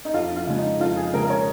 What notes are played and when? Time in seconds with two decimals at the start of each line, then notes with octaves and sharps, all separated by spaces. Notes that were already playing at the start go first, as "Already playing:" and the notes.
0.05 D#4
0.14 F2 F4
0.36 F4
0.47 C#3 G#3
0.58 D#4
0.80 F2 F4
0.97 G#4
1.14 C#3 G#3 A#4
1.24 A#4
1.30 C#5